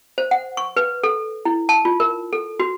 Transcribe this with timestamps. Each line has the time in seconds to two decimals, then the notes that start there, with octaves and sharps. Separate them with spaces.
0.18 C5
0.31 F#5
0.57 C#6
0.77 B4
1.03 A4
1.45 E4
1.69 A5
1.85 F4
2.00 A#4
2.33 A4
2.60 F#4